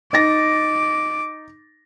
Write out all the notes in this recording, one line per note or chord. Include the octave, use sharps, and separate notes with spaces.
D#4 D6 A6 A#6